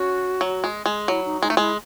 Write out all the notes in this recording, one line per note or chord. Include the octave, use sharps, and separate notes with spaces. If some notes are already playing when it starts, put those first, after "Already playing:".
Already playing: C#4 F#4
F#3
G#3
G#3
F#3 E4
D#4
G#3 D#4
A3
G#3 E4